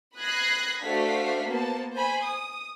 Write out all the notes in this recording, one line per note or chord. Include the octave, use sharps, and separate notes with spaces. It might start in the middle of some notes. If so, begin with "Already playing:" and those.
B5 D#6 F#6 G#6 A#6 C7
A3 D4 F#4 C5 F5 B6
A#3 B3 C5 A5
C5 G#5 B5
D#6